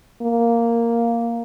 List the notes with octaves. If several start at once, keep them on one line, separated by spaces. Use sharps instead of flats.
A#3